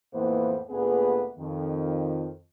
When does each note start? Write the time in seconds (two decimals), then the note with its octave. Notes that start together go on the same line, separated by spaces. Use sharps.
0.12 F2 A2 E3 A#3 B3 C5
0.69 D2 A#2 B3 G#4 B4
1.37 F2 D#3